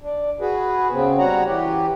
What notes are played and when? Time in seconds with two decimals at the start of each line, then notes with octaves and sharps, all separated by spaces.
0.02 D4
0.41 F#4 G#4 B4
0.92 C#3 B3 C4
1.18 G3 F#4 C#5 F#5 A#5
1.46 E3 G4